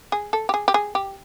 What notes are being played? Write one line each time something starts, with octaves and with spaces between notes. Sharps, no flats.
G#4
A4
G4
G#4
G4
G#4
G4